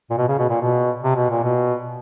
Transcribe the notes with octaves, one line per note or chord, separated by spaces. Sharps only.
A#2
B2
C#3
B2
A#2
B2
C3
B2
A#2
B2